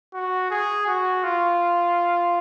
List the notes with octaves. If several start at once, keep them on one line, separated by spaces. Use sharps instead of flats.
F#4
G#4
F#4
F4